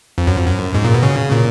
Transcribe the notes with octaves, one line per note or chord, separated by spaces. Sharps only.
F2
F#2
F2
F#2
G#2
A#2
B2
C#3
A#2